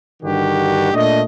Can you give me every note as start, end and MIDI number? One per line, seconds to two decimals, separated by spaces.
0.23 0.90 43
0.23 0.90 50
0.23 0.90 51
0.23 0.90 66
0.23 0.90 67
0.93 1.21 46
0.93 1.21 57
0.93 1.21 62
0.93 1.21 75